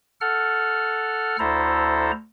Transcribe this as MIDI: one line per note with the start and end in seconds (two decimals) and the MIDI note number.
0.21 1.37 69
0.21 1.37 78
0.21 1.37 89
1.39 2.11 38
1.39 2.11 64
1.39 2.11 69
1.39 2.11 72
1.39 2.11 82